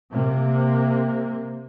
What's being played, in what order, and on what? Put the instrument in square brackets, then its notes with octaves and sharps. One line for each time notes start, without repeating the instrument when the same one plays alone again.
[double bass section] C3 A#3